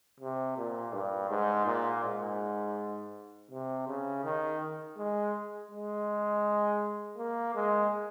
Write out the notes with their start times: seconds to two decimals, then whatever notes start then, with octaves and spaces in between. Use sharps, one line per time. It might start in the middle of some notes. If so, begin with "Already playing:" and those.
0.20 C3
0.57 A#2
0.93 G2
1.30 G#2
1.66 A#2
2.04 G#2
3.51 C3
3.88 C#3
4.24 D#3
4.97 G#3
5.71 G#3
7.18 A#3
7.55 G#3